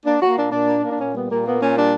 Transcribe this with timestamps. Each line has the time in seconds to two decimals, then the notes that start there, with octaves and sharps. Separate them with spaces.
0.05 A#3 D4
0.21 A#3 F#4
0.36 A#2 D4
0.52 A#2 D4
0.67 A#3
0.83 A#3
0.90 D4
0.98 A#2 C#4
1.14 G3 B3
1.29 A#2 A#3
1.45 A#3 B3
1.60 A#2 C#4
1.76 G3 D4